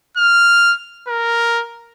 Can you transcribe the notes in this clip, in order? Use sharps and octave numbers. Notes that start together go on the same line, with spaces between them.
F6
A#4